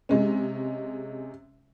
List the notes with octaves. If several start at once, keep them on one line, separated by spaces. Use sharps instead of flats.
C3 G#3 C#4